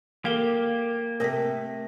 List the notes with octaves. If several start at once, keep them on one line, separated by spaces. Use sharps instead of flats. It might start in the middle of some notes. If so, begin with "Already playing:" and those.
A#3 G4 A4 A#4 F5 G5
C3 A3 A#4 G5 D#6 A#6 B6